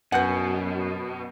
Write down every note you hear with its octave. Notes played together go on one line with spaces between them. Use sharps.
F#2 B2 B4 F#5 G#5 G6